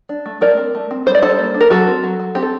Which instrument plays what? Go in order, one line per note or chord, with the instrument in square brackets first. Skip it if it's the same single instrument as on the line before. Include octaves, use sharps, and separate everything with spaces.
[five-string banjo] D4
A3
A3 A#4 D5
C4
A3
C4
G3 C5
D5
G3 A4 C5
A#3
D4
A#4
F#3 F#4 A4
C4
F#3
F#3
C4 G4
A4